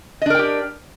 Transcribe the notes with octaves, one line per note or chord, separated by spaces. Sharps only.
D4 G4 A#4 D#5 G5